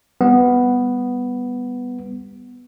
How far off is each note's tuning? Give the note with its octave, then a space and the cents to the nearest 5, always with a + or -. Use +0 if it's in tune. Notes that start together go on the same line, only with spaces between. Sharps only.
G3 +15 B3 +0